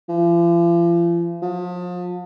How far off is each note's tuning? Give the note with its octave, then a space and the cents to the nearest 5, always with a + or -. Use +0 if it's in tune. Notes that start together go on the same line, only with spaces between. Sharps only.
F3 -40
F3 +35